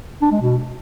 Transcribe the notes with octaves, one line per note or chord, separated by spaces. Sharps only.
D4
G#3
B2